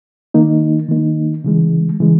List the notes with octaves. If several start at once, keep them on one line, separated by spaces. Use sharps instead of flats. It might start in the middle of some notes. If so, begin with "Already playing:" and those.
D#3 A#3 D#4
D#3 A#3 D#4
C#3 E3 G#3
C#3 E3 G#3